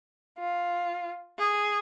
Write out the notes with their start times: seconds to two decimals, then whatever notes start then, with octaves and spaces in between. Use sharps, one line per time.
0.38 F4
1.39 G#4